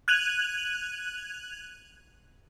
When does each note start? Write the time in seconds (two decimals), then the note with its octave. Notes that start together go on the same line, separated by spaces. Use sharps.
0.08 F#6 G#6 D#7 F7 F#7